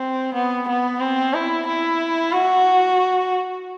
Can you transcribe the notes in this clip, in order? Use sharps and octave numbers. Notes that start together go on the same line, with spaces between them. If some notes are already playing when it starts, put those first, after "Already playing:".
Already playing: C4
B3
B3
C4
E4
E4
F#4